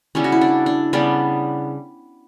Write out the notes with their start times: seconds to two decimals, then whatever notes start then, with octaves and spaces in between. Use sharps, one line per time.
0.15 C#3 G3 B3 C#4 E4
0.24 F#4
0.32 E4
0.41 D4
0.66 D4
0.93 C#3 G3 B3 D4